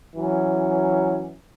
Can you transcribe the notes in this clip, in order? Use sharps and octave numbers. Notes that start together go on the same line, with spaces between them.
E3 F#3 C#4